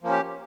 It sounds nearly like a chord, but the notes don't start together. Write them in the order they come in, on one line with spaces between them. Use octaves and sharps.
F3 A#3 C#4 G4